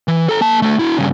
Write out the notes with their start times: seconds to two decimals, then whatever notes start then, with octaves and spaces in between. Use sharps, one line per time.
0.08 E3
0.29 A4 A#5
0.41 A#3 A5
0.62 D3 A3
0.79 E4 F#4
0.98 G2 C#3